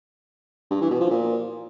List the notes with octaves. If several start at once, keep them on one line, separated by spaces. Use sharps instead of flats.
G2
E3
B2
F3
A#2